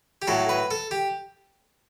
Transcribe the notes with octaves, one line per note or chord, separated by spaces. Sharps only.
G4
A2 F#3 A4
B4
A4
G4